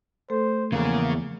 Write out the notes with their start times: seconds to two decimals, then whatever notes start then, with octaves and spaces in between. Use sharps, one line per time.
0.30 A3 A4 C5
0.72 E2 C#3 F3 A#3 G#4